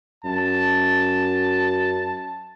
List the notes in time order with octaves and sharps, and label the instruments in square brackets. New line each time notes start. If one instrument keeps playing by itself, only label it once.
[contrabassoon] F#2 [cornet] A5